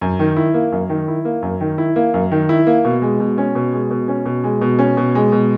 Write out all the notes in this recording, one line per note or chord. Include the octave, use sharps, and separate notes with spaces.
F#2
D#3
E4
A#3
F#2
D#3
E4
A#3
F#2
D#3
E4
A#3
F#2
D#3
E4
A#3
B2
G#3
B2
C#4
B2
G#3
B2
C#4
B2
G#3
B2
C#4
B2
G#3
B2